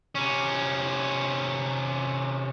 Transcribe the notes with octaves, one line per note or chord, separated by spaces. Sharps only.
C3 C#4